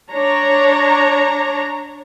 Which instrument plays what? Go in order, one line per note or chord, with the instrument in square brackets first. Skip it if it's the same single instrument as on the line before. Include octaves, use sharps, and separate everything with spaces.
[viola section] D4 C#5 A#5